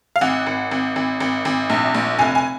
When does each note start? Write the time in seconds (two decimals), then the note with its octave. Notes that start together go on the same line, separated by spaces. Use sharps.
0.16 F5
0.21 G#1 F#5
0.47 G#1
0.71 G#1
0.96 G#1
1.20 G#1
1.45 G#1
1.70 A#1
1.94 A#1
2.19 F1 G#5
2.35 G#5